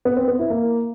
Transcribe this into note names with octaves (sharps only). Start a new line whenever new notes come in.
B3
C4
B3
E4
A#3